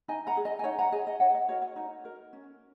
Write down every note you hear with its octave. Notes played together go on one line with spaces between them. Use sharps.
D#4 D#5 G#5
F#5 A#5
G#4
D#5 G#5
G#5
D#4 C#5 F#5
F#5 A#5
G#4 D#5 G#5
D#5
D#4 C#5 F#5
D#5
F#4 A#4 C#5
D#5
D#4 D#5
F#4 A#4
C#4